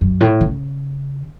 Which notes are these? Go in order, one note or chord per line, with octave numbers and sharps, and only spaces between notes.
F#2
A2
C#3